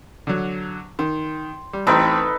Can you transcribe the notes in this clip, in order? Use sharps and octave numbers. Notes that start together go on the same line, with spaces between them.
D3 F#3
D#3 C6
G3
A1 C4 D#4 A4 B4 G5